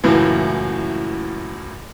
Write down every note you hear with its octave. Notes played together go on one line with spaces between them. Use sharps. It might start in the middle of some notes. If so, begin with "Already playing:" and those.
C#2 F#2 A2 E3